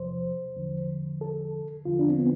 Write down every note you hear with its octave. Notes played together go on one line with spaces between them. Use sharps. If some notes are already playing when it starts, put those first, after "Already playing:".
Already playing: E2 C3 F3 C5
E2 D3 F3
A4
E2 D3 F3 F4
D4
C4
B3